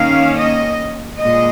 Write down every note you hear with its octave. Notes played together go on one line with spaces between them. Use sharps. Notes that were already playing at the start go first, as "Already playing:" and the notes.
Already playing: D#3 A#3 C#4 F5
D#5
A#2 G#3 D#5